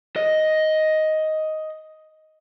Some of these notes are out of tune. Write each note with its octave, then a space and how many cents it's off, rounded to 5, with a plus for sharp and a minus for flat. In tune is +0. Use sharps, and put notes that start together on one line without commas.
D#5 +5